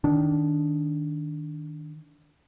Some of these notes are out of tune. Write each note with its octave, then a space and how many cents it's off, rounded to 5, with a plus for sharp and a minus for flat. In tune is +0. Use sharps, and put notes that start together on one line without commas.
D#3 -5 D4 -15